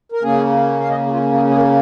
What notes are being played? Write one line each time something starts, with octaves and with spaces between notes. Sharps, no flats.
A#4
C#3 A#3 C#4 G#4
F5
D#5
G#4
F4
G#4
G#4
A#4